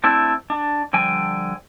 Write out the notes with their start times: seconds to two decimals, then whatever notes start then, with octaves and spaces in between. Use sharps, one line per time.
0.04 A3 C4 D4 E4
0.50 D4
0.93 D3 F3 G3 G5 G#5